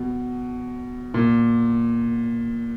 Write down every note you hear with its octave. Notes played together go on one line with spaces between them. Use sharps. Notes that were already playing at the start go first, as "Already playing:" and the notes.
Already playing: B2
A#2